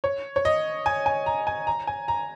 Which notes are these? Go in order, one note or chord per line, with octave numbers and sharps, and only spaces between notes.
C#5
C#5
D#5
G#5
G#5
A#5
G#5
A#5
G#5
A#5